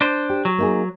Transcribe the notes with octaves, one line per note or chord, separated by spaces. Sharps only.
D4 C5
G4
F#3
A#3 D#4 G#4